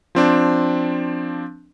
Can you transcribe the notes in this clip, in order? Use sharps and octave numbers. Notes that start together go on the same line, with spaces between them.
F3 C4 D4